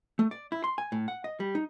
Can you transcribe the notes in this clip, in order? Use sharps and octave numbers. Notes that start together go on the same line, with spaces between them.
A3
D5
E4
C6
G#5
A2
F#5
D#5
G3
D#4